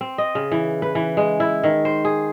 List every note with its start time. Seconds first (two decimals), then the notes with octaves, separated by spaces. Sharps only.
0.01 C4
0.18 D#5
0.35 C#3
0.51 E3
0.82 B4
0.95 E3
1.17 G#3
1.40 E4
1.64 D#3
1.85 C5
2.05 G#4